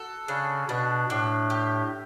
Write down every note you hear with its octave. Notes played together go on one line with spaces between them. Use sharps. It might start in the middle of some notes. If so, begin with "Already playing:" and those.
Already playing: F#4 A4
C#3 D4
B2 D4
A2 D4
G4